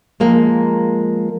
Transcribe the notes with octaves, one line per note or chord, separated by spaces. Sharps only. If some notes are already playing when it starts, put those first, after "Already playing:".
F3 G#3 A#3